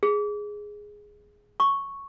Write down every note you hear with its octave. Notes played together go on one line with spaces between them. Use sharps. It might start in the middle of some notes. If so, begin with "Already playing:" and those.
G#4
C#6